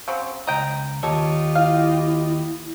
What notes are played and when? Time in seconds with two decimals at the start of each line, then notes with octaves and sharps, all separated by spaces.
0.08 C#3 F#3 C4
0.47 C#2 D#5 G5 A#5
1.03 D#2 F4 G4 A4 C#5 D#5
1.55 E4 F5